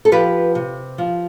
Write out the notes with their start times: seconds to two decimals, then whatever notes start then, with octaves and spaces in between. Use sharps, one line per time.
0.05 A4
0.12 F3 G4 B4
0.55 C3
0.98 F3